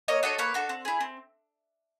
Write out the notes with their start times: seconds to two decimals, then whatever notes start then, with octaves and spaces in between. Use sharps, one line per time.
0.08 A#3 C#5 D#5
0.23 D4 F#4 A4 C#5 D#5
0.38 A#3 B4 C#5
0.54 D4 F#4 A4
0.69 C4
0.85 E4 G#4
1.00 C4